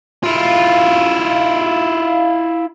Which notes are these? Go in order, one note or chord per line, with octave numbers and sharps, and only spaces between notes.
E4 F4